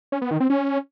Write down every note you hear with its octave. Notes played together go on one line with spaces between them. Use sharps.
C#4
B3
D#3
C4
C#4